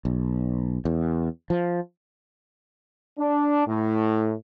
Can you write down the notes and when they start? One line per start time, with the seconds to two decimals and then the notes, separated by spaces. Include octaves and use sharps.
0.05 B1
0.85 E2
1.50 F3
3.18 D4
3.67 A2